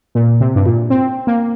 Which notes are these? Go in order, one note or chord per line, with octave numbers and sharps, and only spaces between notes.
A#2
C3
G2
A#2
C4
A#3